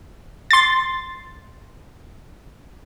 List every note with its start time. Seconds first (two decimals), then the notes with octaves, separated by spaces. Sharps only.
0.51 C6 A6